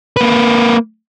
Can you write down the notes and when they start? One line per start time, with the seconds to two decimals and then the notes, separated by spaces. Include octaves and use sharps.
0.17 A#3 B4